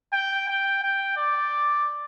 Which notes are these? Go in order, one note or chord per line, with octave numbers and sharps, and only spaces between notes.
G5
G5
G5
D5